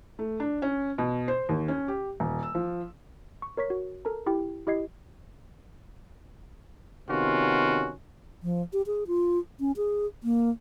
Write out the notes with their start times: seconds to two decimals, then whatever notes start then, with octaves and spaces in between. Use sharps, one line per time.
0.19 A3
0.40 D4
0.62 C#4
0.98 B2
1.28 C5
1.49 D#2
1.68 C#4
1.88 G4
2.20 D#1
2.43 E6
2.55 F3
3.42 C#6
3.57 A#4 C#5 C#6 B6
3.70 F#4
4.05 A4 A#4 A5 A#5
4.26 E4 G4 G5
4.67 E4 G4 D#5 G#6 C7
7.09 C3 D#3 B3 C#4 F4 F#4
8.42 F3
8.73 G4
8.87 G#4
9.07 F4
9.60 C#4
9.77 G#4
10.24 A#3